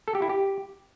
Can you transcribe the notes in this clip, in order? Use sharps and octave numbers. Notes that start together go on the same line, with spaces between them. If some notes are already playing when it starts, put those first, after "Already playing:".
A4
G4
E4
G4